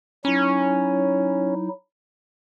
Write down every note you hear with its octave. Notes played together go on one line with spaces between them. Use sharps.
F#3 C#4 D#4 E4